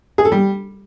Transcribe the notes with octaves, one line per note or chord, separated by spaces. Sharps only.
G#4
A4
G3